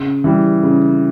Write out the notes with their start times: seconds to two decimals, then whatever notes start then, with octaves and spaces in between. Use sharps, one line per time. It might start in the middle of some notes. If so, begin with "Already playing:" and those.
Already playing: C#3
0.24 E3 G3
0.63 C#3